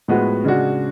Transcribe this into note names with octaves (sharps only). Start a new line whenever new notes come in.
A2 F3 G#3 B3 F#4
C#3 G#3 D4 F#4